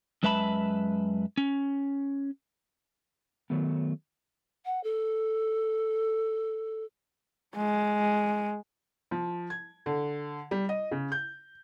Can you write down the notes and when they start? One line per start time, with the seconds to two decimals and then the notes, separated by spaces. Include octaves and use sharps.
0.23 F#2 G#3 B4 E5 A5 B5
1.37 C#4
3.50 D#3 F#3 A3 B3
4.65 F#5
4.83 A4
7.56 G#3
9.11 F3
9.50 G#6
9.86 D3
10.51 G3
10.69 D#5
10.91 C#3
11.12 G6